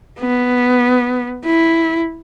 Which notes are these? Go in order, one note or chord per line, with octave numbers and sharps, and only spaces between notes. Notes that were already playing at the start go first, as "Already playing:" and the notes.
B3
E4